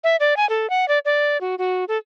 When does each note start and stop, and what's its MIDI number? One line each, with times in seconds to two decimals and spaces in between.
0.04 0.16 76
0.20 0.36 74
0.37 0.48 80
0.49 0.69 69
0.70 0.88 78
0.88 0.99 74
1.05 1.40 74
1.41 1.55 66
1.58 1.85 66
1.88 1.98 69